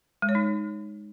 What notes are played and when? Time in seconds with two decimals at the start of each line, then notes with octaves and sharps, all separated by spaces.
0.22 G#3
0.29 C#5
0.35 D#4